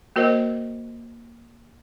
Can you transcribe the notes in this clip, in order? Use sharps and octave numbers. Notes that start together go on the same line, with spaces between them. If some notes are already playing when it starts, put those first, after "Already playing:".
A#3 F#4 A#4 C5 D#5